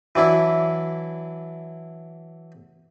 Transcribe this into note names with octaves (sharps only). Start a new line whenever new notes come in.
E3 F#3 D4 E4